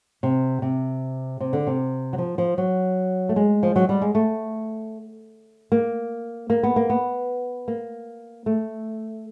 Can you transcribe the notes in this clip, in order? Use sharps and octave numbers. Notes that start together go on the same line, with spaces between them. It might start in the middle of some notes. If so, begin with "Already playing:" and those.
C3
C3
C3
D3
C3
F#3
F3
F3
F#3
A3
G#3
F3
F#3
G3
G#3
A3
A#3
A#3
B3
A#3
B3
A#3
A3